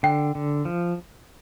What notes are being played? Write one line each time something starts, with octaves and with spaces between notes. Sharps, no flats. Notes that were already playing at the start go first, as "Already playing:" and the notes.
D3 G5
D3
F3